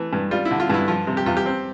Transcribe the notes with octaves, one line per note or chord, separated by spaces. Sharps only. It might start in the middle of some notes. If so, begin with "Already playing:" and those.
Already playing: E3 A3
G2
G3 F4
E4
D3
F4
G2 E4
F3 F4
C3
G4
E2 F4
G4
C4